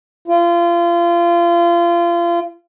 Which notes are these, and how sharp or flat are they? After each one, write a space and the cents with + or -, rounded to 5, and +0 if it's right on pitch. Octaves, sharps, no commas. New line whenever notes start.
F4 -30